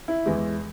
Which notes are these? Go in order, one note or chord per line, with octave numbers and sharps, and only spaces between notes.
E4
E2 E3 G#3